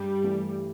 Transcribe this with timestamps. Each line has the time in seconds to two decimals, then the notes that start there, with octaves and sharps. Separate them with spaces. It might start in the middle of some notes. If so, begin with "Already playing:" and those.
Already playing: G2 G3
0.23 E3 A3